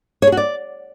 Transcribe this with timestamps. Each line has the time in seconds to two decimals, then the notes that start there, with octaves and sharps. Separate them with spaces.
0.22 C#5
0.27 G#4
0.32 F#4
0.37 D5